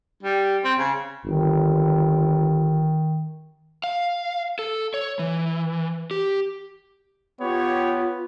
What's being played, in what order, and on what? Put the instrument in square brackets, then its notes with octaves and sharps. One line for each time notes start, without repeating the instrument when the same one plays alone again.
[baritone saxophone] G3
C4
C#3
[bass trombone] G1 [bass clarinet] D#3
[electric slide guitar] F5
A4
C#5
E3
G4
[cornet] B3 [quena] F4 [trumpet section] G4 C#5